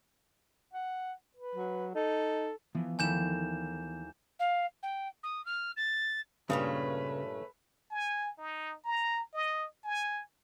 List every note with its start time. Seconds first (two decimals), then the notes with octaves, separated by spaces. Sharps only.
0.73 F#5
1.36 B4
1.55 F#3
1.95 D#4 A4
2.75 E3 F3 B3
2.99 D#2 A3 E4 G#5 G6 E7
4.39 F5
4.82 G5
5.23 D#6
5.45 F6
5.76 A6
6.50 G2 A#2 C#3 A3 A#3 C#4 B4
7.91 G#5
8.38 D#4
8.85 A#5
9.34 D#5
9.84 G#5